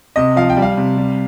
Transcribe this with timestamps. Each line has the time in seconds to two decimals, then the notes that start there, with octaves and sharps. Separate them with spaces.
0.16 C3 D#5
0.36 F3 F5
0.50 G5
0.57 G3
0.62 F5
0.77 C3
0.97 G3